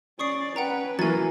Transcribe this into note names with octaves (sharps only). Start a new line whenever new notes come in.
C#4 D5 C#6 D#6 C7
C#4 B4 F#5 G5 A#5
E3 F#3 A#3 G#5 A6